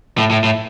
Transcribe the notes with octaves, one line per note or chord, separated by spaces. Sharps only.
A2
A2
A2